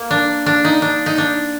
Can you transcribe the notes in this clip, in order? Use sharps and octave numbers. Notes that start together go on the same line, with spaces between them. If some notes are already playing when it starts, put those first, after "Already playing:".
Already playing: A#3
D4
D4
D#4
D4
D#4
D4